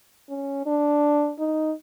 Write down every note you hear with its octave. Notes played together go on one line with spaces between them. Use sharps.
C#4
D4
D#4